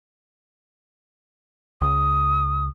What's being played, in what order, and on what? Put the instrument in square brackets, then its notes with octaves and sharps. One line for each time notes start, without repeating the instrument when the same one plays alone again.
[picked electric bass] C#2 [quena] D#6